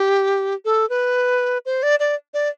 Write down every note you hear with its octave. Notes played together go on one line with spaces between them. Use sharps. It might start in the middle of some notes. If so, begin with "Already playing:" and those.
Already playing: G4
A4
B4
C5
D5
D5
D5